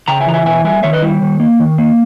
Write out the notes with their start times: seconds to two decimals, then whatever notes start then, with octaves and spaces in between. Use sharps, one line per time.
0.08 C#3 G5 A#5
0.20 E5 G#5
0.27 E3 A#5
0.34 E5 G#5
0.46 B2 E5 G#5
0.64 G3 E5 G#5
0.83 D#3 C#5 E5
0.93 B4 D#5
1.02 G3 E4
1.22 D#3
1.40 A#3
1.60 D#3
1.78 A#3